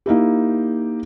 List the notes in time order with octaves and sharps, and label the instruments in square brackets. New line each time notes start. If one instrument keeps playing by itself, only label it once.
[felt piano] A#3 D#4 E4 G4